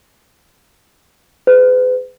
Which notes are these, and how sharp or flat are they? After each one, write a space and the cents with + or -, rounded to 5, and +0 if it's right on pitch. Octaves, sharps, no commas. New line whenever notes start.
G#4 +0 B4 +40